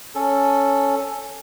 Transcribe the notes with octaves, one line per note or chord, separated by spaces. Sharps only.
C#4 A4